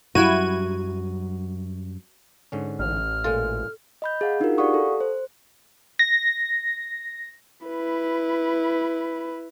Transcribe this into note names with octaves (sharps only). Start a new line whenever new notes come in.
F#2 F#3 G3 E4 F#4 G#6 D#7
G#2 D3 C#4
A1 F6
A#2 G#3 F4 A4
D#5 B5 G6
G#4 F5 F#5
D4 D#4 F4 F#4 G#4 A#4
G4 D5 F5 F#5 C#6 D#6
A4
C5
A#6
E4 B4